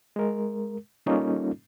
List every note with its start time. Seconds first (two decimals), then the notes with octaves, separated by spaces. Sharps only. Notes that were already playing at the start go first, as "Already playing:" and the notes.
0.16 G#3 A#4
1.06 G3 A#3 C#4 D#4 F4 A4